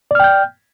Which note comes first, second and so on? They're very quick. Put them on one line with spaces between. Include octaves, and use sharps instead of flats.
D5 F6 G5 G6